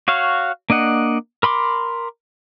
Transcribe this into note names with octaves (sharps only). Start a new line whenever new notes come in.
F#4 C#5 F5
A#3 D4 D#5 F#5
A#4 B5 C6 D6